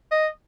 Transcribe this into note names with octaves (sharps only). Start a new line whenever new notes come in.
D#5